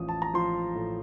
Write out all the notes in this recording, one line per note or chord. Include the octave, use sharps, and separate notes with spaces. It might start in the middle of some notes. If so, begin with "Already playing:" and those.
Already playing: A1 F3 D#6
A5
A#5
F3 C6
A2